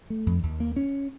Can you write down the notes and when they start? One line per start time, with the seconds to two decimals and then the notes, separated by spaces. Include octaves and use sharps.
0.10 A3
0.26 F2
0.43 D#2
0.60 A#3
0.76 C#4